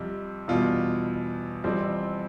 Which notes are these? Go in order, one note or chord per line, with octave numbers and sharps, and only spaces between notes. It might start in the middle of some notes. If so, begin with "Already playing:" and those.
Already playing: F2 C3 G3 G4
E2 B2 G3 F4
F2 E3 G3 C4